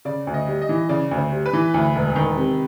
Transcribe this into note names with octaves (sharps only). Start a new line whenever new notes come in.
C#3 D5
D2
D#5
G3
D#5
E3
C#3 D5
D2
C5
G3
B4
E3
D2
E1
D#3
C3